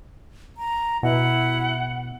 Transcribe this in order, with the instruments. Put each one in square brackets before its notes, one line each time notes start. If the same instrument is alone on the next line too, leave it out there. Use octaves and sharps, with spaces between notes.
[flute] A#5
[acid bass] B2 [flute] E4 [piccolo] F#5